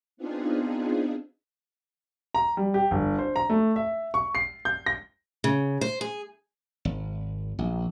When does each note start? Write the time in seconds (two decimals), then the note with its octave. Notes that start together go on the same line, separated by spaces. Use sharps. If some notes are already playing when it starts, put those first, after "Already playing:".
0.17 B3 C4 D4 D#4 F4 G#4
2.35 A#5
2.57 G3
2.74 G4
2.91 G1
3.19 C5
3.36 A#5
3.50 A3
3.76 E5
4.14 C#6
4.35 C7
4.65 G6
4.86 A#6
5.44 C#3
5.81 C5
6.01 G#4
6.85 G#1
7.59 A#1